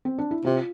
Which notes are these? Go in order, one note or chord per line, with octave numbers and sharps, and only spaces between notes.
C4
D4
E4
C3 F4